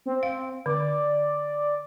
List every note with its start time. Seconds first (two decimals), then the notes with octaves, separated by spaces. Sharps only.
0.06 C4
0.23 F5
0.66 D3 D5